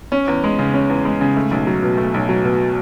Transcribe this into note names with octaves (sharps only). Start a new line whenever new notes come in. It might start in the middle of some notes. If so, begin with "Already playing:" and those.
C#4
E2
G#3
C#3
C#4
E2
G#3
C#3
A3
B1
F#3
B2
A3
B1
F#3
B2